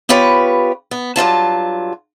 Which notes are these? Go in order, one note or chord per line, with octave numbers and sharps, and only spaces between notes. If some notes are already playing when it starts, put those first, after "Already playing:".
B3 F4 G4 B4 C#5
B3
G2 F#3 F4 A5